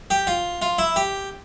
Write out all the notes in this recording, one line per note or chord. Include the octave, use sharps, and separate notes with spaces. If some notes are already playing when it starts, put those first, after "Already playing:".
G4
F4
F4
E4
G4